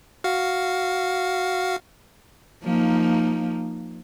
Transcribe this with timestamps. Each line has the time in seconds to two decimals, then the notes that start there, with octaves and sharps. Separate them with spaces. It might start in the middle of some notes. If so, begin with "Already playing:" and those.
0.24 F#4 F5
2.63 F3 A#3 D#4